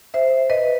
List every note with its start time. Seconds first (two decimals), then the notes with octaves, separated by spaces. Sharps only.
0.14 C5 E5
0.50 B4 D#5